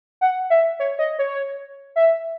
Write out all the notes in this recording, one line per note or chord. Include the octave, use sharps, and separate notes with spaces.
F#5
E5
C#5
D#5
C#5
E5